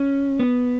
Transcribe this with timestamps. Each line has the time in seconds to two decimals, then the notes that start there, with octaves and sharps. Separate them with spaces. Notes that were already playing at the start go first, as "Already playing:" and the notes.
Already playing: C#4
0.39 B3